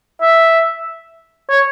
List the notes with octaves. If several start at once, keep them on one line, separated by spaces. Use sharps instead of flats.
E5
C#5